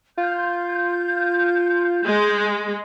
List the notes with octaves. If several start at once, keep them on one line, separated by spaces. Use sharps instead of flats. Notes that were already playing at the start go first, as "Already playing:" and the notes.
F4 G6
G#3